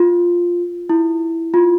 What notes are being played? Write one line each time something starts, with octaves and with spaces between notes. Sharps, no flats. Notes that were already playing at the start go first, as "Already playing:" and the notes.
Already playing: F4
E4
F4